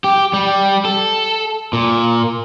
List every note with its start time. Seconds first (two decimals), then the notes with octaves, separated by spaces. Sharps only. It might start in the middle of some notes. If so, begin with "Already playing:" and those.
0.04 G4
0.33 G3
0.85 A4
1.73 A#2